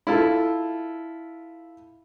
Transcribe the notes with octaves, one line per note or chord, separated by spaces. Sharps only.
E4 F4 A4